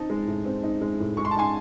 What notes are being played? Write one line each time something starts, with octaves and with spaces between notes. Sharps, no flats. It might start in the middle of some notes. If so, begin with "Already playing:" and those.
Already playing: C4 D#4 A5
G#3
A2
C4
D#4
G#3
A2
G#3 C#6
C6
A5
D#4 G#5 C6